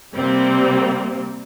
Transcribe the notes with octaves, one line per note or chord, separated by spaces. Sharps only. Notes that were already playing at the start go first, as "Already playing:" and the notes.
C3 G3 A#3 C4